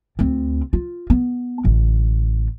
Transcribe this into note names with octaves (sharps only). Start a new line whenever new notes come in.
D2 C4
F4
B3
A1 D3